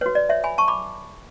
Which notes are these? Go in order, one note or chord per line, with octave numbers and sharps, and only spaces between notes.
F#4 B4 C#5
D5
C#5 E5
G#5 B5
A5 C#6
B5 D6